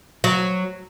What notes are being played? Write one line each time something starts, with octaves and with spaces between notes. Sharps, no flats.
F#3